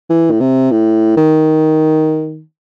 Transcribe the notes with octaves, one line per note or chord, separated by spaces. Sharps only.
E3
A2
C3
A2
D#3